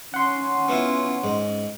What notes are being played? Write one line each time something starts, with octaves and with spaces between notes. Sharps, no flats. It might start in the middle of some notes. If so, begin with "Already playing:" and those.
C#4 F#5 C6
B3 E4 F4
G#2